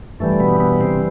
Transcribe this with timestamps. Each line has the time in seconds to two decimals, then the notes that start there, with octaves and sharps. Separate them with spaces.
0.20 G2 E3 G3 A3
0.40 B2 B3
0.60 B2 B3
0.81 C3 C4